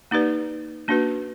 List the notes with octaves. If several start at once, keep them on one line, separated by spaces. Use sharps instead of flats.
A#3 D#4 G4 B4 D5
A#3 D4 F#4 B4